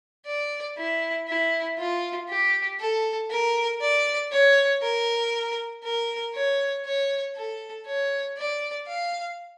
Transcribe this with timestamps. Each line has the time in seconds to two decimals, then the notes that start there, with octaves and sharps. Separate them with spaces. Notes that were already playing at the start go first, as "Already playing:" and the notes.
0.27 D5
0.77 E4
1.28 E4
1.79 F4
2.29 G4
2.80 A4
3.31 A#4
3.81 D5
4.32 C#5
4.83 A#4
5.84 A#4
6.35 C#5
6.85 C#5
7.36 A4
7.87 C#5
8.38 D5
8.88 F5